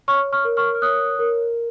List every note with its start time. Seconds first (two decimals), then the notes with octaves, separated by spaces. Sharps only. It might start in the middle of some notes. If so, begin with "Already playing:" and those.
0.08 C#5 C#6 F6
0.33 C#6 F6
0.44 A#4
0.57 C#6 F6
0.75 F6
0.82 C#5 D#6 F#6
1.19 A#4